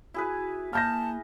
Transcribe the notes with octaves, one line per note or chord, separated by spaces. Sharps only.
E4 F#4 G#4 B4
A#3 A5 F6 G6 A#6